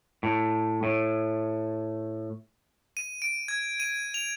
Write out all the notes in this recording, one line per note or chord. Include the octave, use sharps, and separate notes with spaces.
A2
A2
D#7
D7
G#6
D#7
F7